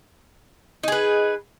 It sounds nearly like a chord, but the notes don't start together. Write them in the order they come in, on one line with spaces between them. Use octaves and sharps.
D#4 G#4 B4